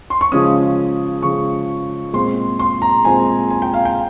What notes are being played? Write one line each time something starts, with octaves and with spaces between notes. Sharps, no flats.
C6
C#6
C#3 F3 G#3 C#4 D#6
C#3 F3 G#3 C#4 C#6
A#2 G#3 C4 C6
C6
A#5
A#2 G#3 C4 G#5
G#5
G5
F5
G5